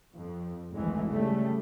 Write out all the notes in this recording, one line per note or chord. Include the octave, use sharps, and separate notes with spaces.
F2
G#1 D2 E3 G#3 A3
C#3 G3 A3